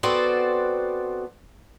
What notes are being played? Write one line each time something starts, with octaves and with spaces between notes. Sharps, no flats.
B3 C4 F#4 A4 C5 D5